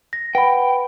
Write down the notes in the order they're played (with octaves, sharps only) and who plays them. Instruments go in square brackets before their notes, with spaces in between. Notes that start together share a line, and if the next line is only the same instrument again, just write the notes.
[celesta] A#6
[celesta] B4 F#5 B5 [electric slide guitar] G5